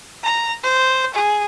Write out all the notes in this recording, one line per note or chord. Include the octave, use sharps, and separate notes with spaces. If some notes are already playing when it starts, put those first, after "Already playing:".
A#5
C5
G#4